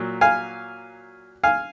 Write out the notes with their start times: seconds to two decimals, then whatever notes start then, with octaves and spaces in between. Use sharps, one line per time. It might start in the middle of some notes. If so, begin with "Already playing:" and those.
Already playing: A#2 F#3
0.21 F5 G#5
1.44 F5 G#5